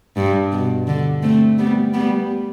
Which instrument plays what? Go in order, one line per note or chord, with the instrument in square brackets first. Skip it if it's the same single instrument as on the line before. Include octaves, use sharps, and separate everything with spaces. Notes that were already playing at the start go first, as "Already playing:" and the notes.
[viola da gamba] G2
B2
D3
A3 C4
G3 B3
G3 B3